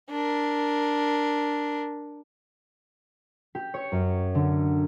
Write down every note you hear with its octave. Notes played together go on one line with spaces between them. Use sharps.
D4 A#4
G4
C#5
F#2
D3